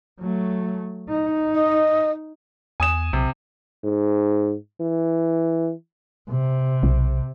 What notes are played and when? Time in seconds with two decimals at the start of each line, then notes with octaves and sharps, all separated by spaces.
0.20 F#3 A3
1.09 D#4
1.54 D#5
2.80 E2 G#5 D#6 E7
3.13 B1 C3
3.84 G#2
4.81 E3
6.30 C3
6.83 B1